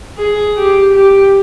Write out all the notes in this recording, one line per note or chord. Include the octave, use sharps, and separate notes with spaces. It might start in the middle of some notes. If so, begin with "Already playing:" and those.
G#4
G4
G4